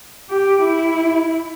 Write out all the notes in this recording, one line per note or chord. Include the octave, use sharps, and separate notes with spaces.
G4
E4